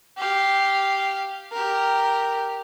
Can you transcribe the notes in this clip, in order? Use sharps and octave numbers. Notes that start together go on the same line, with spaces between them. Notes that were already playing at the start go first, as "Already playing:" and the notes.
G4 F5
G4 A#4